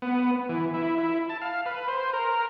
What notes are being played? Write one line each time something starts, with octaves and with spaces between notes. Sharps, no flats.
B3
E3
E4
E4
A5
F5
B4
C5
A#4